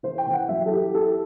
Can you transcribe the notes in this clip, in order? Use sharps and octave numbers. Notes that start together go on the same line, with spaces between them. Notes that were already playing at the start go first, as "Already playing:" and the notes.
E3 C5
G5
E3
F#5
F#3 E5
A4
E4 G4
E4 A4